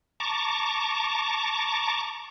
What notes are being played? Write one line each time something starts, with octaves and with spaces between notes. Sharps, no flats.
A5 A#5 C#6 D6